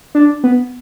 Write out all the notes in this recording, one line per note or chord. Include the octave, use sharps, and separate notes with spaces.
D4
B3